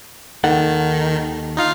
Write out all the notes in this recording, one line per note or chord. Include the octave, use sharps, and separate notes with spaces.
D#2 D#3 A4 F#5
D#4 F4 F5